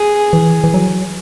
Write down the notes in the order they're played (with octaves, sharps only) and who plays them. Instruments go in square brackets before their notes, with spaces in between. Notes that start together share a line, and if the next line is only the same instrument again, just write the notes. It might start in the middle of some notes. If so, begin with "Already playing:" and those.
Already playing: [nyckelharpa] G#4
[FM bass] E3
E3
F#3